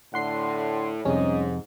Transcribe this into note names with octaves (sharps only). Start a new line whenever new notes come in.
A2 D3 F#5 C6 C7
F2 G#2 C3 G3 C#4 G#4 D#5